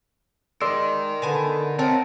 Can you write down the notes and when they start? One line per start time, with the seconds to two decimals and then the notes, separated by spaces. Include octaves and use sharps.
0.61 G#3 A#4 D5 D#5 C6 E6
1.22 D3 B3 G#5 A5
1.79 C4 A#4 C#5 D#5 F#5 A5